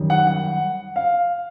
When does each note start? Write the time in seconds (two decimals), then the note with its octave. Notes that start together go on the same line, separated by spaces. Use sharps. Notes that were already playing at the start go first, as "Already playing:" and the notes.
Already playing: F#2 D#3 G3
0.10 F#5
0.27 F#5
0.96 F5